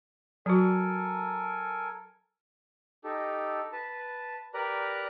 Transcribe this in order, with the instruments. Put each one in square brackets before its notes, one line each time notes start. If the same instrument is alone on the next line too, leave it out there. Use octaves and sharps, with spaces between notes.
[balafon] F#3 F#4 [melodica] A4 A#4 G#5
[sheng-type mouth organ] D#4 G4 A4
B4 A5
G4 A#4 B4 D5 A#5 F#6